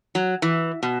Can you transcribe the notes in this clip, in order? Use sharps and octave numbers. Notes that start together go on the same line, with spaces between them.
F#3
E3
B2